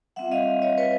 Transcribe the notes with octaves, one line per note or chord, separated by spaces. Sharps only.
G3 C4 F4 E5 F#5
D#5 F5
C#5 D#5
B4 C#5